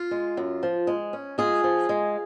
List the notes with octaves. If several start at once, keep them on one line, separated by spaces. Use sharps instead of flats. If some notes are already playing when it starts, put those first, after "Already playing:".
Already playing: F4
G#3
F#2
F3
G#3
C#4
G#3 F4 G#4
F3
G#3